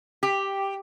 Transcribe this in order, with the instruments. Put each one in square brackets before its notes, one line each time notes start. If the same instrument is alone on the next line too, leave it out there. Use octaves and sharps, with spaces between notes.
[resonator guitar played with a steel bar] G4